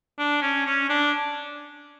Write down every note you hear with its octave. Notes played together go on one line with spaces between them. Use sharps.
D4
C#4
C#4
D4